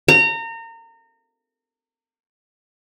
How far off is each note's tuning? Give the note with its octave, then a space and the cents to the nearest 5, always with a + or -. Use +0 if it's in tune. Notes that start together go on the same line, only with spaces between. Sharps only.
A#5 -30